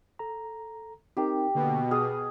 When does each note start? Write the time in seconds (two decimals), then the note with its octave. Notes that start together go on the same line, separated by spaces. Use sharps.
0.19 A4 A#5
1.17 C4 D#4 G4 A#4
1.55 B2 D3 A#3
1.91 G#4 D#6 F6